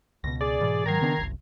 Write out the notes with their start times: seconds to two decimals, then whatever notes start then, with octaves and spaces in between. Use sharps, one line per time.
0.24 C#2 B2 A#6
0.41 G#4 D5
0.61 G#2 B2 E3
0.86 G#2 D#3 F#3 A#5 G#6 C7
1.01 C#3 B3 D4
1.18 F#1 C2